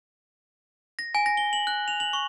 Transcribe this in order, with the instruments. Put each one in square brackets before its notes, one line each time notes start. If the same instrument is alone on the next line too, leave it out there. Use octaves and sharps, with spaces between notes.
[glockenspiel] A#6
G#5
A#6
G7
F#7
F#6
F7
F#7
C#6